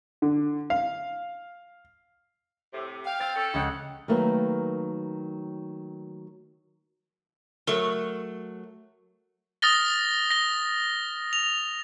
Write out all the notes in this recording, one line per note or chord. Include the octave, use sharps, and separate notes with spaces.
D3
F5
A2 C3
F5 G5
C4 F5 A6
C#4 A4
C#2 G#3 F#5
D#3 F#3 A3 A#3 B4
F#3 A3 A#4 C#6
D#6 F6 A6 A#6 G7
A#6 G7
F7